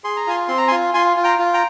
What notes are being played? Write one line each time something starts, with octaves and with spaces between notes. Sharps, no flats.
G#4 C6
A#5
F4 G#5 C6
C4 C6
A#5
G#5 C6
F4
F4 G#5 C6
F4
G5 A#5
F4
G5 A#5